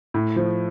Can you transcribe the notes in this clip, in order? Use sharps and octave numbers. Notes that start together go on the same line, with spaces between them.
A2
F3